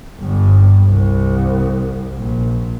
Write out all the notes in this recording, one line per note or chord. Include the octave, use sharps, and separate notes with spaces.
G1 G2
C2
A#1